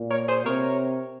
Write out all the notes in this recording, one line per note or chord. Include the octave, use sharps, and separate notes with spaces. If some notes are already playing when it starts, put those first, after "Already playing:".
Already playing: A#2
A#4 C#5
G#4 C5
C3 A#4 C#5